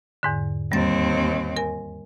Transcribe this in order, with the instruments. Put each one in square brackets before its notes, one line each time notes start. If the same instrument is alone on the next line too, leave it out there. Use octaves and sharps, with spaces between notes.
[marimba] E2 G#2 D3
[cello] D#2 C4 [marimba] G3 A6
[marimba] A#4 G#5